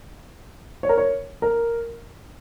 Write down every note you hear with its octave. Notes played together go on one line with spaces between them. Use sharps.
C#5
A#4
C#5
A#4